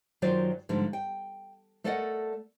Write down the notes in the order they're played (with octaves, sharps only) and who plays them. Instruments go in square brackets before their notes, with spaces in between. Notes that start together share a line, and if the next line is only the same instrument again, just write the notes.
[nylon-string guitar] F#2 D#3 F#3 F4 C5 D5
G#2 D3 F3 G3
G5
A3 A4 A#4 D5 D#5 F#5